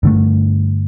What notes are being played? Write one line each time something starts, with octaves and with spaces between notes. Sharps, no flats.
G2 D3 A3